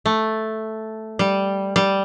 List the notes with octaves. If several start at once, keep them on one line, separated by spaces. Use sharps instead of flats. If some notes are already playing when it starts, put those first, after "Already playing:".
A3
G3
G3